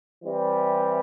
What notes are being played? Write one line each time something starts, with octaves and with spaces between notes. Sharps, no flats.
E3 G3 C4